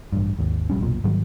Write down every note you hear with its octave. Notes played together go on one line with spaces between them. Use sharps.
A1 G2
G#1 D#2
E1 A#1 G3 C#4
F1 B1 A#2
G#2 D#3 F#3 G3